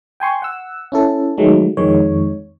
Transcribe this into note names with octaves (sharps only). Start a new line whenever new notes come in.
G5 G#5 C6 C#6
F#5 E6
C#4 E4 A4
D#3 F#3 G#3 A3
F2 D#3 G#3 C#5